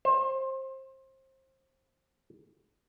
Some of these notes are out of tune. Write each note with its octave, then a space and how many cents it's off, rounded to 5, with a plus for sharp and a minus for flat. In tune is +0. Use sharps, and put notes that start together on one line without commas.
C5 +25